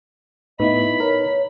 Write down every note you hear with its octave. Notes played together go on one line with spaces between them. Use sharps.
A2 B3 D#4 E4 B4 D#5 B5
A#4 C#5